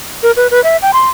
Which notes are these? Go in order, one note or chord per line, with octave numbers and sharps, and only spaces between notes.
A#4
B4
B4
E5
G5
C6